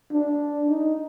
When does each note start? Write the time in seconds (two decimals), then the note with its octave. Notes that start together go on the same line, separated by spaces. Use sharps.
0.11 D4
0.68 D#4